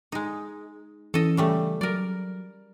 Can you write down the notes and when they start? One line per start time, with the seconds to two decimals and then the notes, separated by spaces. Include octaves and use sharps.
0.12 G#3 D#4
1.14 E3 C#4 A4 D#5
1.37 C#3 G3 A3
1.81 F#3 A#4 D5